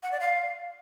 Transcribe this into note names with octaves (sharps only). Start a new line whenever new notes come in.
F#5
D5
F5